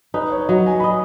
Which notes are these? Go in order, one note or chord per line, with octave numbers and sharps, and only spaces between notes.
D#4 B4
C#5
F#3 D#5
G#5
D#5 B5